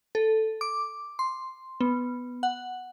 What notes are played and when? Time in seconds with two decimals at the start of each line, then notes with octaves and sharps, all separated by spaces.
0.15 A4
0.61 D6
1.19 C6
1.81 B3
2.43 F#5